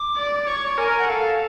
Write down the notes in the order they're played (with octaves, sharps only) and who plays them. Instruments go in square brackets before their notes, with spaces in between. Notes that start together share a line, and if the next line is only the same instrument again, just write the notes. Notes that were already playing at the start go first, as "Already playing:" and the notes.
Already playing: [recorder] D6
[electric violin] D5
[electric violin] C#5 [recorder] C#6
[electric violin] A#4 [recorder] G#5
[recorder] G#5
F#5
[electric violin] A4 [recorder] F5